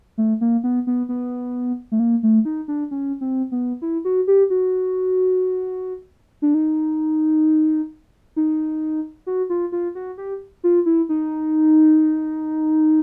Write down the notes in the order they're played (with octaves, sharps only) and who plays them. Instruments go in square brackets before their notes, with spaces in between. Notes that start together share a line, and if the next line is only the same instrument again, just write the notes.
[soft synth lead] A3
A#3
B3
B3
B3
A3
A#3
A3
D#4
D4
C#4
C4
B3
E4
F#4
G4
F#4
D4
D#4
D#4
F#4
F4
F4
F#4
G4
F4
E4
D#4